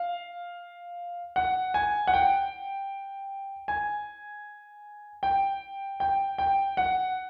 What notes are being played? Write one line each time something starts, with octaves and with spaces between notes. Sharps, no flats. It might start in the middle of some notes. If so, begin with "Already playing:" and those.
Already playing: F5
F#5
G#5
F#5
G5
G#5
G5
G5
G5
F#5